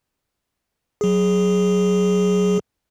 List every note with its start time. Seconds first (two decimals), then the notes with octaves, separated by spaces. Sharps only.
1.01 F#3 G#4